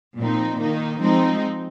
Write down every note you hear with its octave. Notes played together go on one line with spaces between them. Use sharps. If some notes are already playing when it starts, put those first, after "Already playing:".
A#2 F3 C4 D#4
D#3 A#3 D#4
F3 G#3 C4 D#4